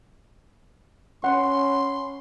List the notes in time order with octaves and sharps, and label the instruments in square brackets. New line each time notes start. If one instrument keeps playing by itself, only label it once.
[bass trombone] C#4 [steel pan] F#5 [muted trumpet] C6